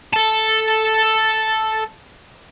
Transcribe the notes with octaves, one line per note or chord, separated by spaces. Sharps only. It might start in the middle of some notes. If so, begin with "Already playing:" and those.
A4 A5